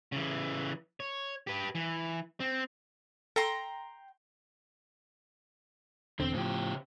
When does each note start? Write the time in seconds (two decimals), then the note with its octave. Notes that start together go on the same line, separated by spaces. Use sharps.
0.12 C#3 E3
1.00 C#5
1.47 G4 B4
1.75 E3
2.40 C4
3.36 A4 G5 A#5 C6
6.20 E1 E2 D3 C4
6.34 A2 C#3 F3 G4